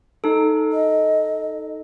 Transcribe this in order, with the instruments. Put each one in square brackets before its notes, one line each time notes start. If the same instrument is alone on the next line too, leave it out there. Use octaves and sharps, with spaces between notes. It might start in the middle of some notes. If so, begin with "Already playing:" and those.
[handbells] D#4 A4
[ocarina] D#5